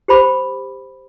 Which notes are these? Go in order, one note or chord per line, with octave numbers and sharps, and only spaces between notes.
G4 C5 B5 D6